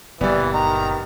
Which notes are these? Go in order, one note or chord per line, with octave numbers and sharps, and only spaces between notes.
F#1 A#2 E3 G3 B3 D5
D#3 A#5